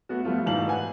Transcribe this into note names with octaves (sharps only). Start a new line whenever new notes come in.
A3 B3 F#4
F3 G3 A3 B3 F4
E1 G#2 E3 F5 A5 F#7
B4 F#5 G#5